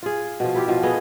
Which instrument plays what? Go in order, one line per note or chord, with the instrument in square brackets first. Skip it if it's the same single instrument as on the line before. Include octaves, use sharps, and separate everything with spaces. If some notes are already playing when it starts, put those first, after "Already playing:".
[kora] F4 G#4
B2 F3
E4 F4 G4
B2 F3
A3 B3 G#4 D#5